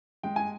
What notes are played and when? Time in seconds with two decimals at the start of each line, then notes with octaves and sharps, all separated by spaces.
0.23 G#3 G5
0.36 G#5